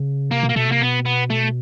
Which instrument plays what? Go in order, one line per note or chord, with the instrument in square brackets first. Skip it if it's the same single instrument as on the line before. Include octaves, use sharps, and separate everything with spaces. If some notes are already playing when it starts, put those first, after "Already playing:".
Already playing: [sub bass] C#3
[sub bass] C3 [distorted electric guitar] A#3
[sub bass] B2
[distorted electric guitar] A#3
[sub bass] B2 [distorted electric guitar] A3
[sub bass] C3 [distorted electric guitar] A#3
[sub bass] B2 [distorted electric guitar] B3
[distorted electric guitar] B3
A3